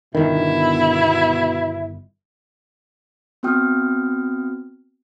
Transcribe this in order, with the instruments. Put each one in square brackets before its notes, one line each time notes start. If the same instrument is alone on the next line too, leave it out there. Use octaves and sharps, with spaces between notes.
[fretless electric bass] G1 D#3 [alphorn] B2 [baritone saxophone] E4
[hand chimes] B3 C4 F#4 G5 D#6 F6